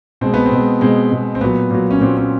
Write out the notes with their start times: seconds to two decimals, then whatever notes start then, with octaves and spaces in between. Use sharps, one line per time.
0.21 B2 G#3 C4
0.34 B3
0.46 C4
0.51 B2 G#3
0.81 B2 G#3 C4
1.12 B2 G#3
1.35 C4
1.41 A#2 F#3 B3
1.71 A#2 F#3
1.91 C#4
2.01 A#2 F#3 C4
2.17 C#4